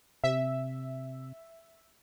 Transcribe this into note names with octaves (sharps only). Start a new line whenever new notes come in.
C3 E5